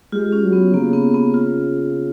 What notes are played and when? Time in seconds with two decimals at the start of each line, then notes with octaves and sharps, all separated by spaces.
0.12 G#3 F4 G4
0.32 C#4
0.43 F#3
0.53 B3
0.73 C#3 A#3
0.93 B3
1.14 B3
1.34 F4